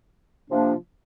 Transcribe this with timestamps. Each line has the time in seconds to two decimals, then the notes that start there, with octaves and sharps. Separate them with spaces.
0.50 C3 F3 A#3 D4